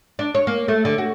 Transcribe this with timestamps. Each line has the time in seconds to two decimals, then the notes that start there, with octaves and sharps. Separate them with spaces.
0.19 D4
0.35 C#5
0.47 A#3
0.68 A3
0.85 D3
0.98 F#4